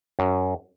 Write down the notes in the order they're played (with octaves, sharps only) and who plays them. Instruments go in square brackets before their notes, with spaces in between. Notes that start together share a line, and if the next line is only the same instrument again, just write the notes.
[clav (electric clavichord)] F#2